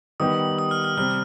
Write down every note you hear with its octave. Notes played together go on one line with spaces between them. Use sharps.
D#3 G3 B3 D#4 G4 D#6
D#6
F6
F6
C3 G3 C4 F6